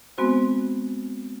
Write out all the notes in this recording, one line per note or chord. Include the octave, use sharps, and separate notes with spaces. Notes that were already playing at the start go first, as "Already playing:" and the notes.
G#3 B3 C4 F#4 C5